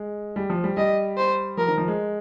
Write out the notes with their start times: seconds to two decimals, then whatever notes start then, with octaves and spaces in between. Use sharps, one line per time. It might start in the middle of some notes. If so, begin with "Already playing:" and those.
Already playing: G#3
0.36 G3
0.50 F3
0.64 G3
0.77 G3 D#5
1.18 C5
1.57 F3 A#4
1.68 D#3
1.78 F3
1.88 G#3